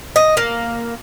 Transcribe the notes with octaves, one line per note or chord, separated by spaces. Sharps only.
D#5
A#3